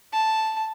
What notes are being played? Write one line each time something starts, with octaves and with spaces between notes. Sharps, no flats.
A5